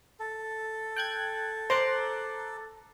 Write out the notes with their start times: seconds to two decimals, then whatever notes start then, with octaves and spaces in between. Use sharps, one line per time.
0.20 A4
0.96 G5 F#6 G#6
1.70 C5 A#5 D6 F#6